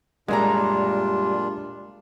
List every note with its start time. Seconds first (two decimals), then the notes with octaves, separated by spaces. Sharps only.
0.28 F#2 A#2 G3 G#3 D4 F4 A#5